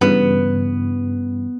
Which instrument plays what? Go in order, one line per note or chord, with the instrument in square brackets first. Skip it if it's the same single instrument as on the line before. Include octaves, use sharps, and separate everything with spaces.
[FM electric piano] G2 C#3 E3 [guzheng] B3